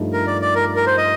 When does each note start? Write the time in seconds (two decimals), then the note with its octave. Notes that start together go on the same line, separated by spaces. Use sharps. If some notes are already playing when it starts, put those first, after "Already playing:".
Already playing: G2 F3 A3 D#4
0.13 A#4
0.27 D5
0.41 D5
0.55 A#4
0.76 A#4
0.87 C5
0.97 D#5